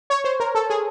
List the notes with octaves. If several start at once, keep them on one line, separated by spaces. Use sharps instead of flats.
C#5
C5
A#4
A4
G#4